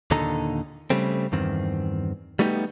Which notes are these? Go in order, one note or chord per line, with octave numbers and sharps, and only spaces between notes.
D#2 A#2 D3 D#4 A4 A#5
C#3 G3 A3 C4
E2 G2 D#3 C4
G3 A3 B3 D#4 G4